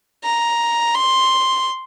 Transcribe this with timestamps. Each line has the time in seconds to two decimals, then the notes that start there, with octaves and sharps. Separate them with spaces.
0.24 A#5
0.94 C6